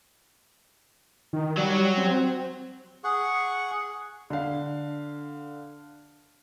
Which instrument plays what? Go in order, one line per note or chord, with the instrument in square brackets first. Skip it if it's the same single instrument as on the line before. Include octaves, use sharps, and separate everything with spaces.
[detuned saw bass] D#3
[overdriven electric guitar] F#3 F#4 [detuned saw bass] G3
[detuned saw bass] C4
[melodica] G#4 F#5 C#6
[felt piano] D3 F5